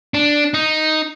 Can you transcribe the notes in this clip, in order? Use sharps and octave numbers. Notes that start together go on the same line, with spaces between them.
D4
D#4